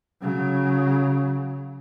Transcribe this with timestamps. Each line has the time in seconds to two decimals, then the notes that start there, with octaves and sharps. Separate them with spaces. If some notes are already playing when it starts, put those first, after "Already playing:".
0.21 C#3 F#3